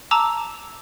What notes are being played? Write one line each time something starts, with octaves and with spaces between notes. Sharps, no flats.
A5 A#5 D6 E6